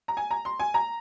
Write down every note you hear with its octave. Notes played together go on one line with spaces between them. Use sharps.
A#5
G#5
A#5
C6
G#5
A#5